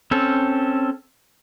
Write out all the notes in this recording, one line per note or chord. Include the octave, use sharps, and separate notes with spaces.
C4 C#4 A4